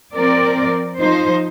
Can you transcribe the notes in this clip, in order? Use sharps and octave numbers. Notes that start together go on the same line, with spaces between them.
F3 C4 A#4 D5
F3 D#4 C5